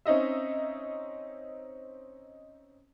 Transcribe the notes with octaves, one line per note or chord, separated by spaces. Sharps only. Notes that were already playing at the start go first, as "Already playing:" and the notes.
C4 C#4 D#4 D#5 E5